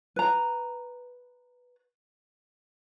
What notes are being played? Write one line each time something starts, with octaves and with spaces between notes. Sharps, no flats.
B4 A#5